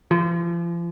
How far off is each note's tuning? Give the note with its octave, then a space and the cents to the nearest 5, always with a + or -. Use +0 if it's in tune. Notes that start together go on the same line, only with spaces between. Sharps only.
F3 -40